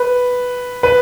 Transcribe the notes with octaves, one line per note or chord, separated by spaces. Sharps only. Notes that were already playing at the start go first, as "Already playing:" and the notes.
Already playing: B4
B4